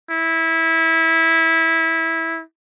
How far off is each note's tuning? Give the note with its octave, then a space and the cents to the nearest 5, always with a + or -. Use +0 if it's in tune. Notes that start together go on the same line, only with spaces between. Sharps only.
E4 -15